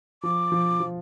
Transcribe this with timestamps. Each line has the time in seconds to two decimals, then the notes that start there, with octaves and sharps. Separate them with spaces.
0.23 F3 D6
0.52 F3
0.80 F3